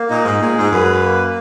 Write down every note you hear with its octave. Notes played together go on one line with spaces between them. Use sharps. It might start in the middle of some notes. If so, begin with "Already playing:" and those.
Already playing: A#3
A#2 D#4
G#2
A#2 G#4
G#2
F#2 B4
A#3